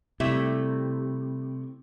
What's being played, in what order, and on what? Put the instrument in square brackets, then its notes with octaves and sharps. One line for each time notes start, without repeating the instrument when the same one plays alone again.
[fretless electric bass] C3 [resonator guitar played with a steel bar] G3 A3 E4